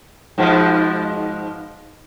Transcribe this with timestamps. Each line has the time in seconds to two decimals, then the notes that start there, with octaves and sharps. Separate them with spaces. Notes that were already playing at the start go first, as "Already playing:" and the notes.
0.38 G#2 B2 F3